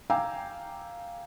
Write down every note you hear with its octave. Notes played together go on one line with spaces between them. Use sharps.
F5 G5 G#5 A#5 D6 E6